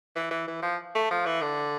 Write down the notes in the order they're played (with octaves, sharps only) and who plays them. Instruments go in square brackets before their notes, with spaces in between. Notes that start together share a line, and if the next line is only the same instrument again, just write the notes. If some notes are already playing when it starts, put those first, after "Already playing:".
[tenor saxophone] E3
E3
E3
F3
A3
F3
E3
D3